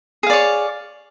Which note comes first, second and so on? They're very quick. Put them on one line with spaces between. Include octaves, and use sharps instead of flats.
G#4 F5 D5 C#5